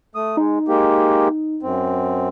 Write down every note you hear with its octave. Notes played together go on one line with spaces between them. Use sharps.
A3 D#6
G#3 D#4
G#3 A#3 G4
F#2 C4